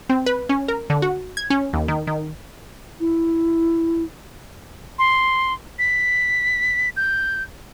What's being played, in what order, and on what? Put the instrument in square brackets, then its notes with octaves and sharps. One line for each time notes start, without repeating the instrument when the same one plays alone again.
[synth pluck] C4
B4
C#4
A#4
D3
F#4
G#6
C#4
D#2
D#3
D#3
[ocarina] E4
[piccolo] C6
B6
G6